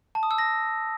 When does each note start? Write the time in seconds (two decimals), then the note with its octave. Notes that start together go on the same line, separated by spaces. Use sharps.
0.15 A5
0.23 D#6
0.31 E6
0.38 A#6